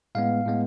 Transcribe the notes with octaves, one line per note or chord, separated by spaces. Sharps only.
A2 G#3 B3 F5
A2 G#3 B3